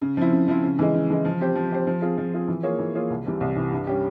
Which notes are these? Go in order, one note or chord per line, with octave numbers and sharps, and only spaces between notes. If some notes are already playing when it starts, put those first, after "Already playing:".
C#3
F3 C4 E4
C#3
F3 C4 E4
C#3
E3 G#3
C#3
E3 G#3
F3
C4 G4 C5
F3
C4 G4 C5
F3
C4 F4 G#4
F3
C4 F4 G#4
E3
A#3 F4 G#4 C#5
E3
A#3 F4 G#4 C#5
C2
C3 E3 G3 C4
C2
C3 E3 G3 C4
G2
G3 C#4 G4